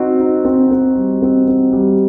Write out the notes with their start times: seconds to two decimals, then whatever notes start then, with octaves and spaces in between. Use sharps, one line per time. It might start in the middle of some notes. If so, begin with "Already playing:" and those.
Already playing: C4 D#4 F#4
0.20 D#4
0.45 C4
0.71 C4
0.96 G3
1.22 C4
1.48 C4
1.73 G3